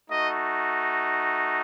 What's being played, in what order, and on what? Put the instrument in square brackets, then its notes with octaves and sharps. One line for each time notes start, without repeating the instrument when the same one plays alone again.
[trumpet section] A3 D#4 F#4 D#5